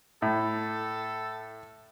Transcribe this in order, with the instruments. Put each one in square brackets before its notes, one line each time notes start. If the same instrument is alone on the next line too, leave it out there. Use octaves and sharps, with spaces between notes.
[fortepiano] A2 [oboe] A4